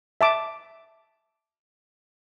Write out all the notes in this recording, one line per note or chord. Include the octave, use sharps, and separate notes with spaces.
E5 A5 D6